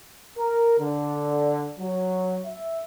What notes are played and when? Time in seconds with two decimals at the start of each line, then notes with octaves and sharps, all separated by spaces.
0.38 A#4
0.79 D3
1.80 F#3
2.46 E5